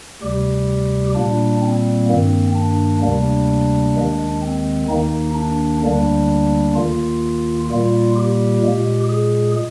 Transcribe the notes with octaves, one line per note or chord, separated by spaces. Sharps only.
D2 C3 G3 G4
A#2 G3 A#3 D4
C4
G2 D#3 A#3
D4
D2 C3 G3 A#3 D4
D#2 D#3 G#3
C4
D#2 D#3 A#3 D#4
D4
D2 D3 G3 A#3 D4
D#2 D#3 A#3 F4
A#2 G3 A#3 F4
G4
A#2 G#3
G#4